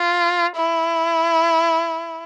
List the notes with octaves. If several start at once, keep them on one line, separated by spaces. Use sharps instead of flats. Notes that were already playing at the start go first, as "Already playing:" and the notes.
Already playing: F4
E4